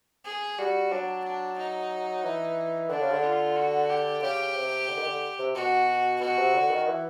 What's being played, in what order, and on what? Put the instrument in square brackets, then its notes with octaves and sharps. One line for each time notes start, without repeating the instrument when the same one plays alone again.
[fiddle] G#4
[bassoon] G3 [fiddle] F#4
[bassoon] F#3 [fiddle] D4
[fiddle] D4
D#4
[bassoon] E3
[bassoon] D3 [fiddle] D4
[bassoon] C#3
D3
[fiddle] F4
F#4
G4
[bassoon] C#3 [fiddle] G4
[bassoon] C3
D3
D#3
D3
C3
[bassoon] B2 [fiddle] F#4
[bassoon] B2 [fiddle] F#4
[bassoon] C3
D3
D#3
E3